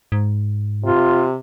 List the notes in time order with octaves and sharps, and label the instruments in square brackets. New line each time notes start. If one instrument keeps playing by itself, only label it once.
[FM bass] G#2
[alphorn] C3 [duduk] F4